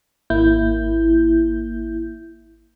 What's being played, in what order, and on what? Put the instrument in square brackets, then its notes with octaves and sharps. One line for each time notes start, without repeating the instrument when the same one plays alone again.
[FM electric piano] G#1 A#3 E4 G6